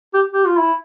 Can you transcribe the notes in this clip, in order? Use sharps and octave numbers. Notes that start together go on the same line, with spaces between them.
G4
G4
F4
E4